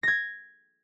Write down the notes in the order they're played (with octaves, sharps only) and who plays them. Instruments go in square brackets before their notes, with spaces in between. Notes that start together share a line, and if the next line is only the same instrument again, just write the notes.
[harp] G#6 A#6